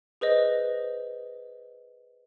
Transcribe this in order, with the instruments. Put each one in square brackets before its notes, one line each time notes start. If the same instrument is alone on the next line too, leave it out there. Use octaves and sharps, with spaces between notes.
[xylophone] G#4 B4 C5 D#5